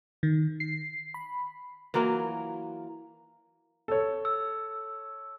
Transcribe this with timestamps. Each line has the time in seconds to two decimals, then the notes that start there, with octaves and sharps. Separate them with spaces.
0.23 D#3
0.60 C7
1.14 B5
1.94 E3 F#3 A#3 F4
3.88 A4 C#5
4.25 E6